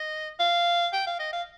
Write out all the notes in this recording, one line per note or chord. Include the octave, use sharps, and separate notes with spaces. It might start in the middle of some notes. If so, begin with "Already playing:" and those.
Already playing: D#5
F5
G5
F5
D#5
F5